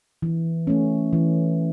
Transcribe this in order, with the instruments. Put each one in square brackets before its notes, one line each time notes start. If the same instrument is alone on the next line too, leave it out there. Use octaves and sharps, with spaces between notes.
[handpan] E3
A3 C#4
E3